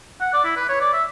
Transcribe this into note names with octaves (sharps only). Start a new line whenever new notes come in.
F#5
D5
E4
B4
C#5
D5
E5